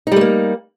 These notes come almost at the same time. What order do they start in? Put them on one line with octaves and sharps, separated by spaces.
D#4 G3 A3 A#3